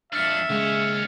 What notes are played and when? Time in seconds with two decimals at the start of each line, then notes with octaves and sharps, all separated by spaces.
0.13 F2 D4 E5 F6 A6 C#7
0.50 D#2 C#3 G#3 C#4